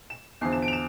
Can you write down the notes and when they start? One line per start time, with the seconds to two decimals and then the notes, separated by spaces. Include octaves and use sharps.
0.10 E7
0.41 E2 D3 F3 C7
0.52 E7
0.62 D7
0.68 F7
0.73 E7